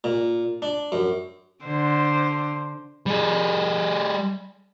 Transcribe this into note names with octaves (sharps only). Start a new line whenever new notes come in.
A#2
D4
F#2
D3 C5
G3 G#4